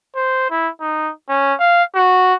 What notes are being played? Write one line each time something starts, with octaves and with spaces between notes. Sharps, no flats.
C5
E4
D#4
C#4
F5
F#4